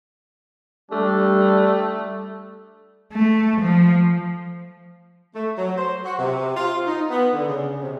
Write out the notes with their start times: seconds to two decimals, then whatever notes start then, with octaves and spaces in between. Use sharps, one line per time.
0.92 G3 A3 D4
3.13 A3
3.61 F3
5.36 A3
5.58 F#3
5.78 C5
6.05 F#4
6.19 C3
6.56 F4
6.87 D#4
7.10 B3
7.34 D3
7.49 C#3
7.82 C3